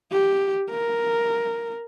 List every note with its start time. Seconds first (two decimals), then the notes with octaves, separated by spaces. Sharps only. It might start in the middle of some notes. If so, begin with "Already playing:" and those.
0.11 G4
0.70 A#4